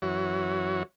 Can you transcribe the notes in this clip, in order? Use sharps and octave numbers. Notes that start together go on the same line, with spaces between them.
F#2 E3 F#4 C#5